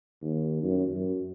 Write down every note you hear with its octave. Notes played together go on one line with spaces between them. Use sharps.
D#2
F#2
F#2